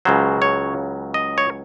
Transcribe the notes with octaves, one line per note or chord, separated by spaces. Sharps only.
C#2 C#3 F#3 C5
C#5
D#5
C#5